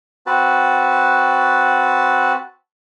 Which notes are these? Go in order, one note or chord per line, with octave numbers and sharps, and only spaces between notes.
C4 F#4 B4 A5